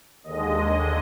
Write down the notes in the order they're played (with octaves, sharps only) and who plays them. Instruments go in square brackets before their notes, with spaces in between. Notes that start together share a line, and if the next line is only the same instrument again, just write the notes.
[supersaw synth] D#2 D3 G#3 D#5